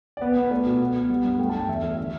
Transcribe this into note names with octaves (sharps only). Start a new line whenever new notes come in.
D5
B3 B4
B3
B4
A3 D5
B2
B3
B3
G3
G2
A3 G5
A5
G2
G5
E2 E5
A3
D3 E5